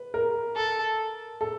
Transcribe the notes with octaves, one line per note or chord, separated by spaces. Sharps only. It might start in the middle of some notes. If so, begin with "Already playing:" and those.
Already playing: B4
A#4
A4
A4